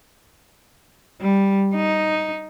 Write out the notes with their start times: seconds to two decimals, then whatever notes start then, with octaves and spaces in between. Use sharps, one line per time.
1.21 G3
1.75 D#4